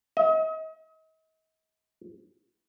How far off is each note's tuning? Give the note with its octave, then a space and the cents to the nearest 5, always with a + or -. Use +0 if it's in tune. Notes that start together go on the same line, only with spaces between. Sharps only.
D#5 +40